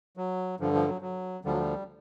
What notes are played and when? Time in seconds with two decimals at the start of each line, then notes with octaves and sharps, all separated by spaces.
0.17 F#3
0.60 G2 D3 F3
0.74 F3
0.88 F#3
1.02 F#3
1.45 D2 D3 F3 G3
1.52 F#3
1.58 G3